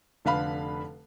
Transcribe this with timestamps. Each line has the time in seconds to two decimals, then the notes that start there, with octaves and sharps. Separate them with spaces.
0.25 F1 D3 B4 F5 B5